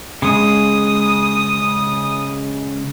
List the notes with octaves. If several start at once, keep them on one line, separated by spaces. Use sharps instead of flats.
C#3 G#3 D#6